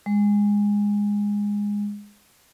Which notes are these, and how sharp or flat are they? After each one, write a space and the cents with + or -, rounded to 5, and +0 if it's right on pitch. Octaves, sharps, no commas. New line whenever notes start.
G#3 -15